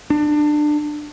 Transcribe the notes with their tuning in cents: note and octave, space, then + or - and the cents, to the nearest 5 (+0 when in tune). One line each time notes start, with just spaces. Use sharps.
D4 +25